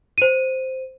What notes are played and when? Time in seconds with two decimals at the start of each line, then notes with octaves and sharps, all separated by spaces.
0.18 C5 D#7